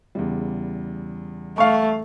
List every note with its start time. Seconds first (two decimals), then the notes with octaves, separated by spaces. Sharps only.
0.15 E2 C#3 G3
1.58 A3 F5 C#6